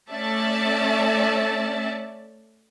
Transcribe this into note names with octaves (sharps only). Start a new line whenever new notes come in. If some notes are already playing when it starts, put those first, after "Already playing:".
A3 C#4 D5 E5 A5